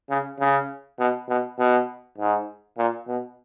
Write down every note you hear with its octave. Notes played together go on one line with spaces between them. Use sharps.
C#3
C#3
B2
B2
B2
G#2
A#2
B2